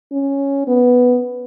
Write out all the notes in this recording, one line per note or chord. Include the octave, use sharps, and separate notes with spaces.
C#4
B3